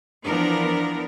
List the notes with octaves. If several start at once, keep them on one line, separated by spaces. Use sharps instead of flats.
E3 F3 B3 D4 A#4